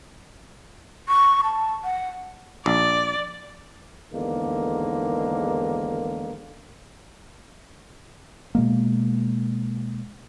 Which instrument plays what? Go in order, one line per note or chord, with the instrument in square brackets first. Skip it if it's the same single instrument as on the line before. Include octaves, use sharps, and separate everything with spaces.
[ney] C#6
A5
F#5
[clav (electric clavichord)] A#1 [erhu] D5
[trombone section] E2 G#2 D3 D#3 A#3
[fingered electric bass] B2 G#3 A#3